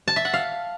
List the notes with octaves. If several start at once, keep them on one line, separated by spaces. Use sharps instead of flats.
A5
E5
F#5
F5